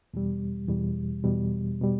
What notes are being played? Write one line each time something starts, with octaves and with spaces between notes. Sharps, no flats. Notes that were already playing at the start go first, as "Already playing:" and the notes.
E2 B2 G3
E2 B2 G3
E2 B2 G3
B2 G3